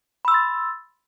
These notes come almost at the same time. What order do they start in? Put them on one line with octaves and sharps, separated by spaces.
B5 E6 C6 A6